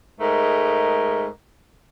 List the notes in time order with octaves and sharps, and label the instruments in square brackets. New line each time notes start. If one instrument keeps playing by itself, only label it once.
[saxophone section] G#2 G#3 A3 A#4